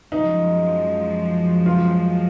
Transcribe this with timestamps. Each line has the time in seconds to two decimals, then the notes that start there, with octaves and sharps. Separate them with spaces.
0.11 F#2 F3 G#3 D#4
1.66 F4